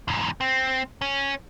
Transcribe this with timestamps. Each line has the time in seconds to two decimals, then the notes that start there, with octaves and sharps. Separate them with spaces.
0.08 E2 G#2
0.41 C4
1.01 C#4